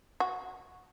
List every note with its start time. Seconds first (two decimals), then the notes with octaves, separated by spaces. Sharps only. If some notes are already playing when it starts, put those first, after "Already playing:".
0.20 F#4